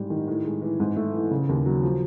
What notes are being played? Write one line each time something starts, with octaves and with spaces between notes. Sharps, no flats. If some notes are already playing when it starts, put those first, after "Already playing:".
Already playing: G#2 G3
D#3
A2
G#3
E3
G#2
A3
E3
C#3
D#2
F#3
F3